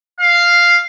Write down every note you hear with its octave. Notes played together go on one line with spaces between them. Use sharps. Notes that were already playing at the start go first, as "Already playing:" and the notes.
F5